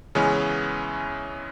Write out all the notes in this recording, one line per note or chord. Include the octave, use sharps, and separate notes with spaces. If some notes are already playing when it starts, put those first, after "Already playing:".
C#3 E3 G#3 B3 C#4